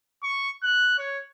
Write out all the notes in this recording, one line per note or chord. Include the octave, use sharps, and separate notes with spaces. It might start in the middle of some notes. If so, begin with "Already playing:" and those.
C#6
F#6
C#5